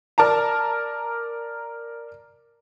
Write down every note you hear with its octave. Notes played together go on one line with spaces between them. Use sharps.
A#4 D5 A5 A#5